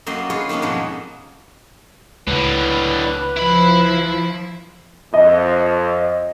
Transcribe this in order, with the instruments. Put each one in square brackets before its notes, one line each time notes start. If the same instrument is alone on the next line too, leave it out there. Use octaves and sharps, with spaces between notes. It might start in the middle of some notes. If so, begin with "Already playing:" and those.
[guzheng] F#2 A#3 F#4 D#5 G5 C6
F4 G#4 B4 C#5 D#5
D#3 A#3 B3 C#4 D#4
F2 G#2 B2 F3 F#3
[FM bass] C#2 [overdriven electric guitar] A2 D3 [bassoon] B4
[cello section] F3 [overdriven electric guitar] E4 B5
[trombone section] F2 [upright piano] D#5